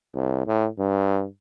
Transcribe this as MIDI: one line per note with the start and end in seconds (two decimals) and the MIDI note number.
0.14 0.45 36
0.47 0.67 45
0.79 1.25 43